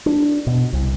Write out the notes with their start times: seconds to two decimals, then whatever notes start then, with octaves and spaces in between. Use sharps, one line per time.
0.06 D4
0.47 B2
0.73 C2